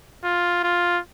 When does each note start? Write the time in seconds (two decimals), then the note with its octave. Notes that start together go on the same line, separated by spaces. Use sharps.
0.24 F4
0.64 F4